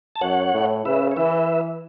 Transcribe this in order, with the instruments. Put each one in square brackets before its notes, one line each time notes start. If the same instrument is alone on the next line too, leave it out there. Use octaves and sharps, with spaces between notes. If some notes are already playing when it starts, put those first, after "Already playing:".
[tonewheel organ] A5
[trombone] F#2 [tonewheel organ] C#5 F#5
[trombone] A2
[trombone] C#3 [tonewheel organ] B4 E5
[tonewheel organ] C#5
[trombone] E3 [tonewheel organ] B4 E5